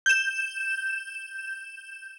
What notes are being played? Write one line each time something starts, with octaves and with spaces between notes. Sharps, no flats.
G6 E7